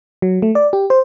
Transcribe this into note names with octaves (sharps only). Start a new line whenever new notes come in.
F#3
A3
D5
G4
C5